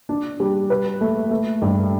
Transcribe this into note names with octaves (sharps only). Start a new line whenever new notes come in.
D4
G3
B4
A3
A3
G2